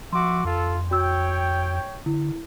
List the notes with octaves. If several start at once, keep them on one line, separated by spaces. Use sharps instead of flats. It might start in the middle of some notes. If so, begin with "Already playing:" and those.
F3 F#4 E5 C6 D6
F2 F4 A4
F#4 C#5 G5 E6
D3 E4